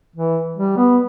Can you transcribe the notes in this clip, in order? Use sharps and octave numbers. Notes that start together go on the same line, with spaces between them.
E3
G3
B3